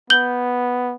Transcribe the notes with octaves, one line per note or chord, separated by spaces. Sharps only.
B3 G6 F#7 G7